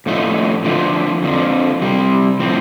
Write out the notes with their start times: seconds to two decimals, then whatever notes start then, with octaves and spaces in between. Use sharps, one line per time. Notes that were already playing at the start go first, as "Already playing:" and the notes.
0.06 A2 F3 A3 D#4
0.65 D3 F3 A3
1.23 F2 D3 F3
1.82 C3 G3 C4
2.40 A2 F3 C4